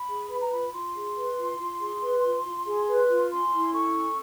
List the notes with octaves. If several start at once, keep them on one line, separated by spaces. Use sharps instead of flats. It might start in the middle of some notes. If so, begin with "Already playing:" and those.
Already playing: B5
G#4
B4 B5
A#5
F4 B5
F4 C6
G#4
B4
F4
F4
G#4
B4
F4
F4
G#4
B4
F4
C#4 C6
E4
A4 C#6
C#4